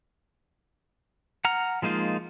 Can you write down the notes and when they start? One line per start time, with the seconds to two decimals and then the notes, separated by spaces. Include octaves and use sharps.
1.45 F#5 A#5 F6
1.82 F3 G#3 A#3 D#4 F4